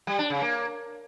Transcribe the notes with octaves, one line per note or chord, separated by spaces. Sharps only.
G3
D4
C#3
A#3